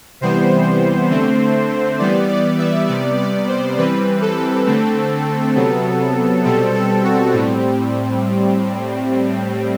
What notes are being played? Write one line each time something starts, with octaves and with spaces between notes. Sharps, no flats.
C3 E3 G3 B3 C5
D3 A3 C4
E3 G3 B3 D5
D5
E5
C3 G3 B3 D5
D5
C5
E3 G3 C4 B4
A4
D3 A3 C4
C3 F#3 B3
B2 G3 C4 A4
A4
F#4
A2 G3 C4